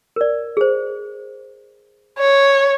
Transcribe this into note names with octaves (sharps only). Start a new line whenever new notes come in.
A#4 D5
G#4 C5
C#5